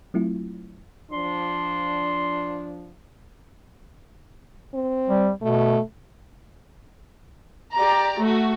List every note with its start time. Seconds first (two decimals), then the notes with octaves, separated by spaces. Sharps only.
0.14 F#3 A3 C4 E4 F4
1.12 F3 D4 C6
4.74 C4
5.09 G3
5.42 B2 A3
7.74 G4 D5 A#5
8.20 A3 F#4